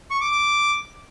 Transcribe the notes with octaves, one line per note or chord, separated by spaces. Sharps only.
C#6
D6
D6